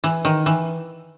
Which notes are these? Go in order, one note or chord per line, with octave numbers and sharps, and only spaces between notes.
E3
D#3
E3